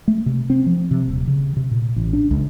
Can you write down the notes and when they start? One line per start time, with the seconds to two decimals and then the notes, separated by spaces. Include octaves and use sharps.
0.08 A3
0.26 C3
0.50 C4
0.66 F3
0.91 C3
1.08 D#1
1.27 C#3
1.57 C3
1.71 A#2
1.96 A1
2.13 D4
2.31 C#2